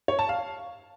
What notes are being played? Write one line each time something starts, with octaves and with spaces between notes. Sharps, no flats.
C#5
A5
F5